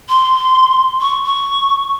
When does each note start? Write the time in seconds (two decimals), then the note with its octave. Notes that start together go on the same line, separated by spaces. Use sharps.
0.09 C6
1.01 C#6
1.26 C#6